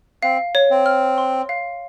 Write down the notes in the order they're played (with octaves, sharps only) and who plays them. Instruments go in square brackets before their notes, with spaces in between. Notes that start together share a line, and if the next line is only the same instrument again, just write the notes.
[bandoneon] C4 [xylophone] F5
[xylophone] C#5
[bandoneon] C4
[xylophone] F6
C6
F5